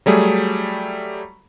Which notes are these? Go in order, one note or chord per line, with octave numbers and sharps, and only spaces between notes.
F#3 G3 A3 G#4